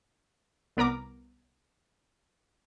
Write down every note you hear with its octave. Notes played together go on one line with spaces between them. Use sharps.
C2 B3 A#4 A#5 D6